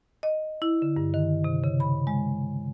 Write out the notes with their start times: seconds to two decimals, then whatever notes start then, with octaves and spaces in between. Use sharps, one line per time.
0.23 D#5
0.62 E4
0.82 D3
0.96 G2
1.14 D#3
1.44 C3
1.64 C#3
1.80 B5
2.07 G#3